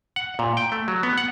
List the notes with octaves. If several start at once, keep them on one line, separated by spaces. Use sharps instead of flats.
F#5
A#2
G5
A3
F#3
B3
F#5